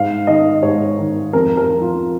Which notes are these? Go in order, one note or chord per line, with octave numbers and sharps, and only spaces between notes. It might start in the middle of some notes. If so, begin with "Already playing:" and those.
Already playing: G#2 F5
D#3 D#5
G#2 C#5
D#3
F2 A#4
A#4
F3
F4